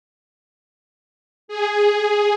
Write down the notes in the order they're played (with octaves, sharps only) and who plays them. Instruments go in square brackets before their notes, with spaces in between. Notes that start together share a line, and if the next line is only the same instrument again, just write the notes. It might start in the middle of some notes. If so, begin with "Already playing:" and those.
[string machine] G#4